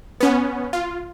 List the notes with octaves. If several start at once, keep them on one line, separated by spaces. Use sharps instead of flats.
B3 C#4
F4